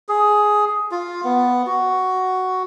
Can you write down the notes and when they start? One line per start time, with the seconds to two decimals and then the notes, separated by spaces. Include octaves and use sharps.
0.09 G#4
0.91 F4
1.24 B3
1.66 F#4